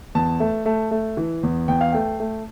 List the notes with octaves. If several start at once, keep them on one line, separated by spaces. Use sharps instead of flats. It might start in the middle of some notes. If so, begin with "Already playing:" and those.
E2 A5
A3
A3
A3
E3
E2
E2 G5
F5
A3 G5
A3